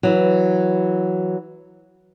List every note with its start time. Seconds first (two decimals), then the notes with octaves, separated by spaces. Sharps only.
0.03 E3 F#3